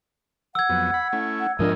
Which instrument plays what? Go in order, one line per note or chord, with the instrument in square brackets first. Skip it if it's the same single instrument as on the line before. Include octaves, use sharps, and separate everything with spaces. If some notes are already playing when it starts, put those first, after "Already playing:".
[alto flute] F#5 [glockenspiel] E6 G#6
[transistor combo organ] F2 F#3 B3
B5
A3 C#4 E4
[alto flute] F#5
[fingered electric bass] G#2 F3 D4 [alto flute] A#4 [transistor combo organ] D#5